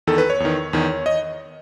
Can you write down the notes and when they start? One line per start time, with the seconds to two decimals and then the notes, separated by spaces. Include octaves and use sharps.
0.07 E2 D#3 A4
0.18 B4
0.30 C#5
0.40 E2 D#3
0.73 E2 D#3
1.06 D#5